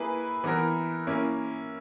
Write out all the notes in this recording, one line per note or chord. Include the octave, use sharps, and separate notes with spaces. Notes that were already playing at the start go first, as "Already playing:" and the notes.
Already playing: A#3 E4 G#4 B4
E3 B3 E4 A#4
A#3 C#4 E4